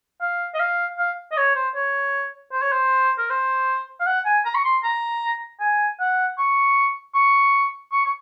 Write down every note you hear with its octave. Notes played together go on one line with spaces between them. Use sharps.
F5
D#5
F5
F5
D#5
C#5
C5
C#5
C5
C#5
C5
A#4
C5
F5
F#5
G#5
A#5
C#6
C6
A#5
G#5
F#5
C#6
C#6
C#6
C#6